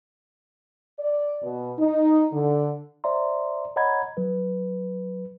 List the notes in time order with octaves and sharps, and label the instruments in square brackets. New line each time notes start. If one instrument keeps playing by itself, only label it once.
[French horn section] D5
B2
D#4
D3
[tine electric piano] C5 D5 E5 A#5 C6
C#5 D#5 F#5 A#5 B5 G#6
F#3 B4